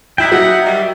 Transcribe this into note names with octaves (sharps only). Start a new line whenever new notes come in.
F#3 D#4 E4 E5 G5
F#3 D#4 F#5
D#3 G3